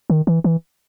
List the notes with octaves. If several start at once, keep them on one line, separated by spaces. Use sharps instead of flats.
D#3
E3
E3